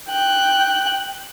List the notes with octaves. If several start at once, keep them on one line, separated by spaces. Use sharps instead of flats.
G5 F#6